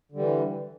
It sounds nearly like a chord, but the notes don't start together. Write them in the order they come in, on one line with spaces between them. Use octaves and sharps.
D3 G3 E3